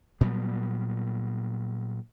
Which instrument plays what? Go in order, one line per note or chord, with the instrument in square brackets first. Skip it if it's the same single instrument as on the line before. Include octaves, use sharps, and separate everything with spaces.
[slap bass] A#2 F#3 G3 B3